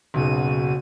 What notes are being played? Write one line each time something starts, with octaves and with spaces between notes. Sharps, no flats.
F#1 B1 C#3 F#4 D#7